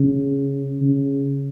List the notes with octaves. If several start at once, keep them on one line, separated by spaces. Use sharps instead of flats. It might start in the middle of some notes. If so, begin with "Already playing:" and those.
Already playing: C#3
C#3